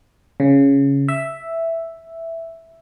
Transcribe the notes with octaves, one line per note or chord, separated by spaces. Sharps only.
C#3
E5